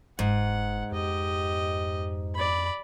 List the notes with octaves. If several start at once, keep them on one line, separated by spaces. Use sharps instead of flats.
F#1 G#2 F#5
F2 G4 D#5
D5 B5